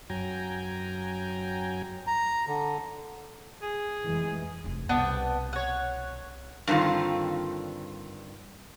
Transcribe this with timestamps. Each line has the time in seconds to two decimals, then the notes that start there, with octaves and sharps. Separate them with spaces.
0.10 F#2 F#3 G5 G#5 A#5
2.07 A#5
2.47 D3
3.62 G#4
4.03 F1 E3 G#3
4.64 F1 F4
4.89 C2 B2 B3 D4 G5
5.53 C#5 F#5
6.67 G2 D3 D#3 C4 F4